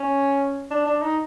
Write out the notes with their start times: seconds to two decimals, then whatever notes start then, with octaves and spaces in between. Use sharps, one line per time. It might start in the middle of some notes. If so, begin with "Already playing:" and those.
Already playing: C#4
0.71 D4
0.86 D4
1.02 D#4